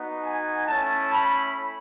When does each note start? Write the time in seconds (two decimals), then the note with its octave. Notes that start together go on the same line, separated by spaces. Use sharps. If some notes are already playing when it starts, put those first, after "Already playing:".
Already playing: B3 D#4 F#4
0.22 G#5
0.66 A3 C#4 E4 A5
1.13 B5